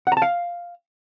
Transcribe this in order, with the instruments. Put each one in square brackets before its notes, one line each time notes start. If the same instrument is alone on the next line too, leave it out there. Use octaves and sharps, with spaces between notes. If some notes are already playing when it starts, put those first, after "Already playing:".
[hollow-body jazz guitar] F#5
A#5
A5
F5